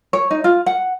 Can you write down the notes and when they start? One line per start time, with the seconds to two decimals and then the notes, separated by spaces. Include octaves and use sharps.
0.13 C#5
0.31 D#4
0.44 F4
0.66 F#5